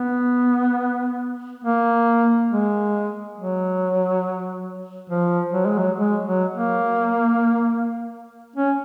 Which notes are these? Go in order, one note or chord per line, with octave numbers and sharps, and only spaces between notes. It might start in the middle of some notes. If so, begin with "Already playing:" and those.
Already playing: B3
A#3
G#3
F#3
F3
F#3
G#3
F#3
G#3
F#3
A#3
C#4